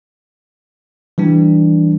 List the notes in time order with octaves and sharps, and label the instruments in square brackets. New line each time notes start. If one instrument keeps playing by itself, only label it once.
[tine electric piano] E3 G3 D4